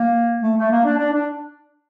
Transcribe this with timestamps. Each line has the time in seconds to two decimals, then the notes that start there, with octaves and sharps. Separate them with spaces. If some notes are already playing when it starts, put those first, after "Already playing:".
Already playing: A#3
0.43 A3
0.58 A3
0.71 A#3
0.84 D4
0.98 D4
1.13 D4